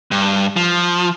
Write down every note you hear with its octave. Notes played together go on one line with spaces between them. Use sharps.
G2
F3